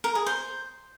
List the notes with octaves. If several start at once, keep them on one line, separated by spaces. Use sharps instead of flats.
A#4
G#4
C5